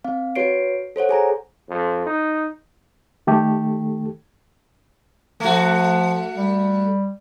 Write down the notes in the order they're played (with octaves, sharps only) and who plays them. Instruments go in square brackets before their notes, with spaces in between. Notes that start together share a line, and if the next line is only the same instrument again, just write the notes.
[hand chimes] C4 F5
F#4 B4 C#5 C7 D7
A4 C5 C#5 F#5
G#4 G#5 A#5
[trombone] F2
D#4
[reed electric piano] D#3 A3 G4 A4
[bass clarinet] F3 [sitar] A3 F#4
[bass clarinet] G3